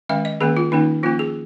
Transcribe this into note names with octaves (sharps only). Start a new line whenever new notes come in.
D#3 G#3 C#4 F5
D#5
D#3 A#3 C#4 G#4
F4
D#3 A#3 C#4 D#4
F3 A#3 C#4 F4
G#4